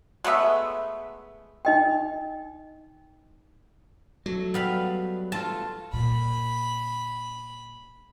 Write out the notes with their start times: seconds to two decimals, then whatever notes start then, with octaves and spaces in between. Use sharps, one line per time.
0.24 G#3 A3 B3 E5
1.65 D#4 D#5 G5
4.26 F#3 A3
4.54 G3 B3 F5 B5
5.32 A3 F4 A4 A5
5.93 A#2 B5